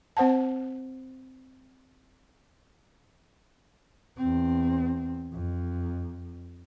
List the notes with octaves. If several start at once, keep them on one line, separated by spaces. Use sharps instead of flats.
C4 C5 F#5 A5
E2 C4
F2